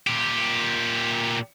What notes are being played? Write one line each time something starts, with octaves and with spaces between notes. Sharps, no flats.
A#2 G4